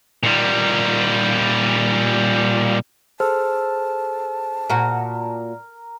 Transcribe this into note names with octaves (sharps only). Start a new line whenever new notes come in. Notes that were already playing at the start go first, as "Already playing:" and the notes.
A#2 G3
G#4 A4 C5 A5 F6
A#2 F#4 A#4